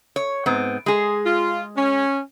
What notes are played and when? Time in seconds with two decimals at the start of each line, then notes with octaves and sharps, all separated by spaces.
0.16 C#5
0.46 G#2 B3 C4
0.86 G#3 G#4
1.25 F4
1.76 C#4